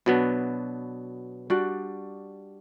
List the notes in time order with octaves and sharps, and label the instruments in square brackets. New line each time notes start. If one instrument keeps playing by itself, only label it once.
[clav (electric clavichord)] B2 F#3 B3 D4 [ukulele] F#4
[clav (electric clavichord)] G3 D4 G4 [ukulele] F#4